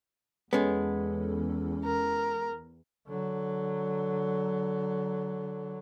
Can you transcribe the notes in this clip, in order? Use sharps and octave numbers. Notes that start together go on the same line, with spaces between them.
E2 G#3 B3 C#4 A4
A#4
D3 F#3